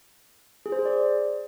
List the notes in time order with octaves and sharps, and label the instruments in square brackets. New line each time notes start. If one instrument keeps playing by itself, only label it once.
[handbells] G#4
C5
G#4
D5